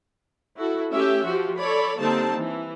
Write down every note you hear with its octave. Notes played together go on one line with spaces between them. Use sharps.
E4 F#4 A4
A3 C#4 G4 E5
F3 F#4 G4
A4 C#5 D5 B5
D3 G3 A#3 C4 D#4 A5
E3